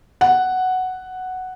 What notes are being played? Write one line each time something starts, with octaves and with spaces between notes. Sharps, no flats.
F#5